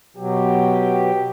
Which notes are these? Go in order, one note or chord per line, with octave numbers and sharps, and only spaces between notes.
B2 F#3 G4